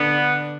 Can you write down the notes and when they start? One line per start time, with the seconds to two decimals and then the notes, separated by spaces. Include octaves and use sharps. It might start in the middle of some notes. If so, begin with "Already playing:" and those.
Already playing: D3 B3 D4